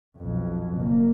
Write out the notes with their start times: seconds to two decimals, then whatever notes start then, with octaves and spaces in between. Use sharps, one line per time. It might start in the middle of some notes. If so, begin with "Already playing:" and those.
0.17 B1 F2
0.75 F#1 A#3